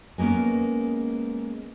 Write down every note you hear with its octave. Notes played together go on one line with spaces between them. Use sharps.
G#3 A#3 B3 C#4